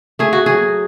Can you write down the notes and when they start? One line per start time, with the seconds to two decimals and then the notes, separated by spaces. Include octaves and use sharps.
0.19 A3 G#4
0.33 F#4
0.46 F#3 G#4